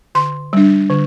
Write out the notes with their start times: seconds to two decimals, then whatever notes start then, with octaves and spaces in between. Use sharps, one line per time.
0.15 D3 C6
0.53 G3 D4
0.90 D3